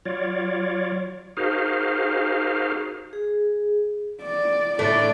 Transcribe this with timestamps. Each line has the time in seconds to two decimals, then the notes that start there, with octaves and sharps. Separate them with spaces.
0.05 F#3 F4 C#5 D5
1.37 D#4 F#4 G#4 A#4 C5 F5
3.13 G#4
4.23 D5
4.79 A2 D3 A3 D5